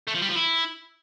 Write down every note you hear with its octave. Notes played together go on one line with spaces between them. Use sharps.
A3
F3
G3
F3
E4